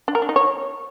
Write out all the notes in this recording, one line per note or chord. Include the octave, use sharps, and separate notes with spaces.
D4
A#4
D4
D#4
C#5